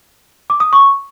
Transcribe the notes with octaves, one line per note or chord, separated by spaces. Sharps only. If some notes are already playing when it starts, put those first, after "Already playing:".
D6
D#6
C#6